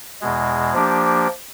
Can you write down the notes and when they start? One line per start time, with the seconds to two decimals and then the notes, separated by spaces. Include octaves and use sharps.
0.21 E2 B2 G#3
0.74 F3 A#3 D4 G4